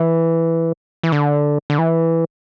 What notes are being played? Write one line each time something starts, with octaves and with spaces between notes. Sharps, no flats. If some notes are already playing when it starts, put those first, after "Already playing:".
Already playing: E3
E3
D3
D3
E3